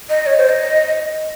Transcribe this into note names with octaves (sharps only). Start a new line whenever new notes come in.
D#5
C#5
C5
D#5